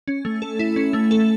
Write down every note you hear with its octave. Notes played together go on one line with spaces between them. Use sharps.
C#4
A3
A4
E4
C#4
A3
A4